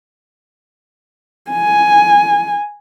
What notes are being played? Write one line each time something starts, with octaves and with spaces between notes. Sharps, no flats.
G#5